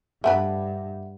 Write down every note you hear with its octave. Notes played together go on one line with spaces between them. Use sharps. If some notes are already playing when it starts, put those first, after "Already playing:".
G2 A3 D4 B4 E5 F#5